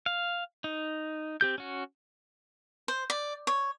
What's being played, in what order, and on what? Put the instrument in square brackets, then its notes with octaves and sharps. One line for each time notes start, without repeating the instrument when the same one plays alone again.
[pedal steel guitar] F5
D#4
C4 G4 G6
C#4 F#4
[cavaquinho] C5
D5
C#5